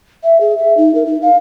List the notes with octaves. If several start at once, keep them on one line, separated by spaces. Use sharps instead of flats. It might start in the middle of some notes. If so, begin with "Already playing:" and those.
E5
G#4
E5
D#4
A#4
D#4
F5